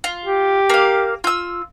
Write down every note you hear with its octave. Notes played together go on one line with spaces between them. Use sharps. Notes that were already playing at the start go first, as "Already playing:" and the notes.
F4
G4
A#3 F5
F4 E6